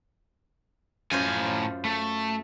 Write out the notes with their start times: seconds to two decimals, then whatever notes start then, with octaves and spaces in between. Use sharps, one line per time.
1.11 F#2 A2 F4 C5 G#5
1.85 A3